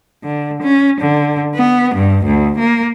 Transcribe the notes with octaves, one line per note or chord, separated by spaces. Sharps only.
D3
C#4
D3
B3
G2
D2
A#3